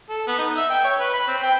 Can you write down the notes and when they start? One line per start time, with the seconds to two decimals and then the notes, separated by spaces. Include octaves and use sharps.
0.10 A4
0.27 B3
0.39 D#4
0.57 E5
0.70 G5
0.84 C#5
0.99 B4
1.13 B5
1.28 C4
1.43 G5